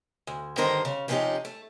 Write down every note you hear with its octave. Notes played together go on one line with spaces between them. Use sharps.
D2
G2 D3 D#3 A#4 C5
C#3
C3 F3 B3 C#4 D#4 G4
A3